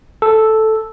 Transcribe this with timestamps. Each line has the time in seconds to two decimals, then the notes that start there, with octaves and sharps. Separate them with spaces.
0.22 A4